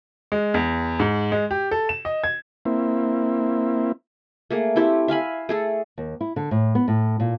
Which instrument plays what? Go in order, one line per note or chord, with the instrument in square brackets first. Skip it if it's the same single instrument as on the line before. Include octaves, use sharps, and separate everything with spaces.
[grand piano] G#3
E2
G#2
G#3
G4
A4
E7
D#5
G#6
[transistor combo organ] A#3 C4 E4
[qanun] A3 A#3 G#4
A3 C4 E4 G4
E5 F5 G#5 B5
A3 G#4 A4
[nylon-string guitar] D#2
E4
D3
A2
B3
A2
A#2